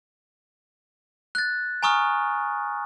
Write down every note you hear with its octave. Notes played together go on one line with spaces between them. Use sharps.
F#6 A6
G#5 A#5 C#6 D#6 F6